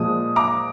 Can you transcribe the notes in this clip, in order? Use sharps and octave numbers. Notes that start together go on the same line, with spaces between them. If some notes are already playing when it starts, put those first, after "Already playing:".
Already playing: A#2 F3 G#3 D#6
A#5 D6